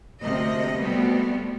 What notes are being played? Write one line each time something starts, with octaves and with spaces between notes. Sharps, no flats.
D2 C3 A#3 D#5
B2 G3 A3 B3 C4